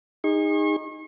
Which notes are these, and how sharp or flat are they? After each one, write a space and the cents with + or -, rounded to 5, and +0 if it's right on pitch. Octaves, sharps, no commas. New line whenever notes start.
D#4 +0 G#4 -30 C#6 -40